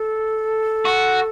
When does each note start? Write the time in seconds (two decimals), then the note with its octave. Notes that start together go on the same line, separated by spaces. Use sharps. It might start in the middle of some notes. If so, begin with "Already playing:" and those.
Already playing: A4
0.85 F#4